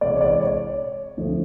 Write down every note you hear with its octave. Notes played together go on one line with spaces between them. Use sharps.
C3 E3 G#3 C4 D5
C#5
D5
C#5
D3 F3 A3 C4